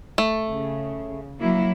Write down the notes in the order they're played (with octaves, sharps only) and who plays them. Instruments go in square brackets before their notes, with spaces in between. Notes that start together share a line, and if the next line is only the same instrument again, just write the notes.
[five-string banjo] A3
[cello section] C#3
F#3 A#3 E4